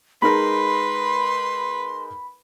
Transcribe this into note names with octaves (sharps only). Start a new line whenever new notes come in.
G#3 D#4 A#4 B4 B5 C6